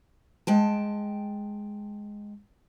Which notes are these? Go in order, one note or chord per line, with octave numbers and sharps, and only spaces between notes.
G#3 G5 A5